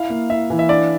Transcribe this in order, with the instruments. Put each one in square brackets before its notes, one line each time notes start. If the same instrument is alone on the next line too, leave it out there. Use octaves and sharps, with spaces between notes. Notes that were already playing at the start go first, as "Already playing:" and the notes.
Already playing: [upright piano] E4 [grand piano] F5
[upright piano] A#3
[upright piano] E4 [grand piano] E5
[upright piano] E3
[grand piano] E5
[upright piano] D4 [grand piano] D5